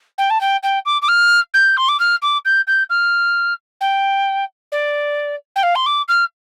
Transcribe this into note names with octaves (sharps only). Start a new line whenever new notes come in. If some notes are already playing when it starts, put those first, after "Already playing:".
G5
A5
G5
G5
D6
D6
F6
G6
C6
D6
F6
D6
G6
G6
F6
G5
D5
G5
F5
C6
D6
F6